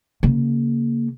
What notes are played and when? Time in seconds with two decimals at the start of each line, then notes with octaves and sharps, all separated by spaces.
0.23 C#3 A#3